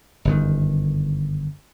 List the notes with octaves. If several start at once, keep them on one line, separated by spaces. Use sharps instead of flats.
G1 F#2 D#3